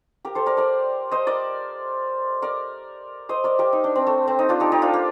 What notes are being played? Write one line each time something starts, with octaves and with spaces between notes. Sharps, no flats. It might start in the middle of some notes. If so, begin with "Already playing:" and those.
G4 A#4
A4 C5
A#4 D5
A#4 D5
C5 D#5
A#4 D5
A#4 D5
C5 D#5
A#4 D5
G4 A#4
D#4
D4
C4
A3
C4
D#4
D4 F4
D#4 G4
D#4 G4
D4 F4
A#3